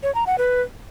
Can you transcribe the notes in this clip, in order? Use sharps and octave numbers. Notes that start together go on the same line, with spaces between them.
C#5
A#5
F#5
B4